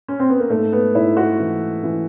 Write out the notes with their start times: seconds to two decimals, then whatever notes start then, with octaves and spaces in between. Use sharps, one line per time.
0.08 C#4
0.20 C4
0.30 B3
0.40 A#3
0.49 G#2 A3
0.73 B3
0.95 G#2 E4
1.17 F#4
1.39 E3
1.84 E3